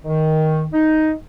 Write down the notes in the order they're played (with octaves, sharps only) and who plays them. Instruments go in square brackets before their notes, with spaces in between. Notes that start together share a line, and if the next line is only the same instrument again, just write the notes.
[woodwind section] D#3
D#4